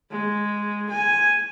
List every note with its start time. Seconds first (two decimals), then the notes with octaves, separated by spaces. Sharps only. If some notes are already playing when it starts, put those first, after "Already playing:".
0.10 G#3
0.90 G#5